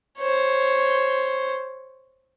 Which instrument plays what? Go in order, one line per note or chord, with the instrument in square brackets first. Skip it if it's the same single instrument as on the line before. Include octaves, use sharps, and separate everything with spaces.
[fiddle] C5 C#5